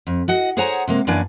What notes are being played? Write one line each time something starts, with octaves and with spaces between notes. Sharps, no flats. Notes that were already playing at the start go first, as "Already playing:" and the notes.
F2
F#4 D#5 F#5
G#4 C5 C#5 F#5 G#5 A#5
C3 G#3 A#3
F#2 E3 A#3 D4 D5 G#5